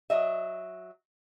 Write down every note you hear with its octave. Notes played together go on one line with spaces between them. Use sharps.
F#3 D#5 E5